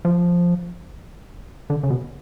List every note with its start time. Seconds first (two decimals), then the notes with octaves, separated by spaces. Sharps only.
0.05 F3
1.70 D3
1.83 C#3
1.90 B2